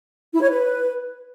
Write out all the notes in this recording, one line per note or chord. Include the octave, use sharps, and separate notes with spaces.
E4
C#5
B4